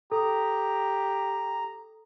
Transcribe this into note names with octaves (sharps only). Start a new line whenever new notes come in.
G4 A4 A#5 D#6